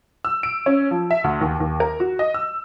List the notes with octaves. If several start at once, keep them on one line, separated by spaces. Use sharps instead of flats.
E6
D7
C#4
F3
E5
D2
D#2
D#2
A#4
F#4
D#5
E6